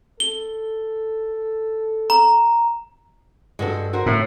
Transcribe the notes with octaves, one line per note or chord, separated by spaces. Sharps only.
A4 G7
A#5
G2 G#3 F#4 A4
F#4 A#4 C5
A2